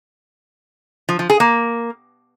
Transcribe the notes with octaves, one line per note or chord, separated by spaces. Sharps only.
F3
F3
G#4
A#3